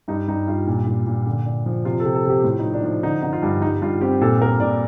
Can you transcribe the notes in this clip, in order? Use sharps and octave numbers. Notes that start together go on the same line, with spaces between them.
G2 D#4
G2 D#4
G2 F4
A#2
A#2
A#2
D3
D4
F3
C3 F4
A4
C3
A4
C3 G4
A2 F4
D#4
F3
D4
F3 D#4
D3 D#4
D3 D#4
F4
G2
G2 D#4
G2 F4
C4 G4
A#2 A4
A#2 A#4
A#2 D5